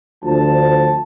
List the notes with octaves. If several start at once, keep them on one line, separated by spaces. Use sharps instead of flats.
D2 F3 A5